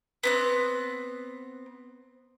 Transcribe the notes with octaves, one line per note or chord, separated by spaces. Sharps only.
B3 C4 F#6